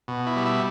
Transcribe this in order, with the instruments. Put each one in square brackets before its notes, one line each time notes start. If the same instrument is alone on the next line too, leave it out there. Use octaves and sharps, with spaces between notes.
[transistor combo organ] B2
E4
G3
E5